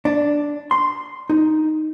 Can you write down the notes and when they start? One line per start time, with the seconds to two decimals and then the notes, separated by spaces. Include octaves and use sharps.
0.05 D4
0.71 C6
1.30 D#4